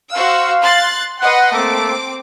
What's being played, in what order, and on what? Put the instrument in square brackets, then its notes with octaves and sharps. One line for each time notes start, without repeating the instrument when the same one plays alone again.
[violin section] F#4 C5 E6 [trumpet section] F5
[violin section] C6 F#6 A6
[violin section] B4 D#5 C6 [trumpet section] F#5
[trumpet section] A3 A#3 A4 [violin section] C4 D6